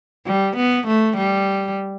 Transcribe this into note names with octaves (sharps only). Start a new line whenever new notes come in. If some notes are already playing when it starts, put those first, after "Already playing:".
G3
B3
A3
G3